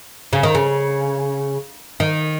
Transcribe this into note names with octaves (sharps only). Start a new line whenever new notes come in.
C#3
D#3
C#3
D#3